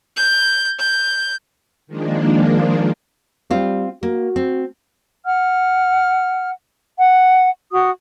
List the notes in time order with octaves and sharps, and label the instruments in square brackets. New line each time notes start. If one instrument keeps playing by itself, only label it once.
[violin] G6
G6
[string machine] D#3 F3 G#3 A#3 D4
[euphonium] G3 [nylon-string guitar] C4 F4
[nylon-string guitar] A#3 [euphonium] F#4
[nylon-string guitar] C4
[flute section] F#5 F6
F#5
F#4 D#6